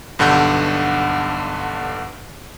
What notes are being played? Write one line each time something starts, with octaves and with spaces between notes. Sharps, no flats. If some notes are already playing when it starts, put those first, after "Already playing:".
B1 G2 D3 F#5 G6